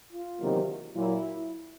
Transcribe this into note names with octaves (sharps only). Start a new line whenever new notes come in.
F4
E2 C3 D#3 F#3 A#3
A#2 F#3 A#3 E4